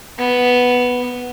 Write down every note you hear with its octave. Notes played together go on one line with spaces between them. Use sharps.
B3